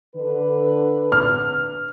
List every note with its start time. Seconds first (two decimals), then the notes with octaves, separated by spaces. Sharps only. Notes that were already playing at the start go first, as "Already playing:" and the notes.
0.15 D3 B4
1.12 F6